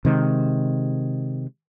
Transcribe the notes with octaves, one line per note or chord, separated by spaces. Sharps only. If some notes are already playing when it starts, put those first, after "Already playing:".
C3 D#3 G#3